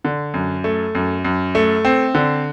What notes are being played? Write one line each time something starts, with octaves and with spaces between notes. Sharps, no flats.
D3
F#2
A3
F#2
F#2
A3
C4
D3